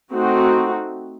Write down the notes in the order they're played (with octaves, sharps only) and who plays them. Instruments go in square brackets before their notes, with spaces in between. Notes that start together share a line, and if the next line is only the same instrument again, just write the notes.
[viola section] A3 C4 D#4 F#4